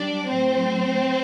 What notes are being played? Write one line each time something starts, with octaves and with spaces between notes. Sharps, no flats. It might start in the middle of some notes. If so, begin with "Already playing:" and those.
Already playing: G3 D4 D5
A2 F#3 C4 C5